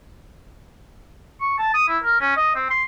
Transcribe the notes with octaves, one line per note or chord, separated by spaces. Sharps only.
C#6
A5
D#6
E4
A#4
C#4
D#5
C4
C6